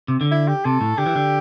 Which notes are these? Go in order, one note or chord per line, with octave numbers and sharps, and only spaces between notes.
C3
D3
E4
G4
C3 A4
A2
D3 G4
E3
D3